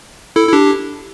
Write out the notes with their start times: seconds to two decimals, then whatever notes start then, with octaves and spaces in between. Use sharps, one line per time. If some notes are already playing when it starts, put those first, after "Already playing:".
0.36 E4 A4
0.48 E4
0.53 D4 G4